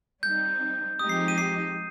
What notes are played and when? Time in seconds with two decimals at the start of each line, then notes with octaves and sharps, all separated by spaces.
0.23 G3 C4 D#4 G6
0.99 F3 G#3 C4 D#4 G4 D#6
1.09 C7
1.28 D#7
1.38 C7